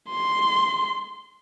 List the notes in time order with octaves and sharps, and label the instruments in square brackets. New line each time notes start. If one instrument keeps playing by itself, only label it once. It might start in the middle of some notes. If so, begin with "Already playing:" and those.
[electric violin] C6